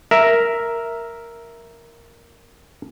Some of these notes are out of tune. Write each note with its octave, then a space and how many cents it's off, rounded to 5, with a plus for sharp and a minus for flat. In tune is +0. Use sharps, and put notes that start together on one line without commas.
A#4 +0 E5 +0